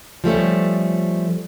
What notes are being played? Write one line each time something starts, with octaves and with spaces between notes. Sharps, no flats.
F3 G3 A3 C#4